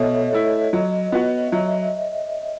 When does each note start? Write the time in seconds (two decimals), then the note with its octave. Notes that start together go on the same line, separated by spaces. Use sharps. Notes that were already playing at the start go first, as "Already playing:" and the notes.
Already playing: B2 A4 C#5 D#5 E5
0.33 A3 E4
0.73 F#3 D#5
1.12 B3 F#4 D#5
1.47 E5
1.52 F#3 D#5